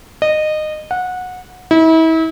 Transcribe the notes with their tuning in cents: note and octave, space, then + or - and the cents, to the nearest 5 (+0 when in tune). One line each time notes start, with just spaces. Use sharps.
D#5 -20
F#5 -20
E4 -35